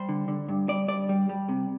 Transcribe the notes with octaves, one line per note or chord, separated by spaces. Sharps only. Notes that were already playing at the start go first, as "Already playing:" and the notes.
Already playing: G3 C5
D3
D3
G2
G2 D5
G2 D5
G3
G3
C3